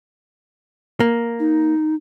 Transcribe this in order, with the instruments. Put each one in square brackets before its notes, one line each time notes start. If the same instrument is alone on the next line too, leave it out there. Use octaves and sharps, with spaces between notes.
[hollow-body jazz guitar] A#3
[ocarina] D#4